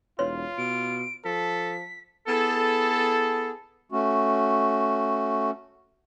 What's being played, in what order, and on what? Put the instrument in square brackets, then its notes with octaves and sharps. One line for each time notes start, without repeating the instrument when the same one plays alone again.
[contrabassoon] E1 [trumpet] F4 [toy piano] B4 C#5 C6
[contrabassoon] B2 [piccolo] D7
[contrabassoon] F3 [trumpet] A4 [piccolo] B6
[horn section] B3 E4 G#4 A4
[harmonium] A3 C#4 F#4